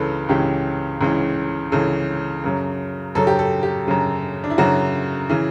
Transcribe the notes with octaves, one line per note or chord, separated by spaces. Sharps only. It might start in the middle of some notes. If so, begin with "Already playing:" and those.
Already playing: C#2 C#3 E3 A4 B4
C#2 C#3 E3 G4
C#2 C#3 E3
C#2 C#3 E3 A4
F#2 C#3 F#3
F#2 C#3 F#3 A4
G4
A4
G4
F#2 C#3 F#3
D4
E4
F#2 C#3 F#3 F#4
C#3 E3